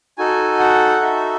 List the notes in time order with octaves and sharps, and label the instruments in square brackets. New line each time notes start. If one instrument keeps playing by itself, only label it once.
[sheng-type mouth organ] D#4 F#4 A4 G#5
F#5
E5